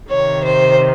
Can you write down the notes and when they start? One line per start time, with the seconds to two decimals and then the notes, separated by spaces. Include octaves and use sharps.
0.11 C3 D#3 C#5
0.45 C5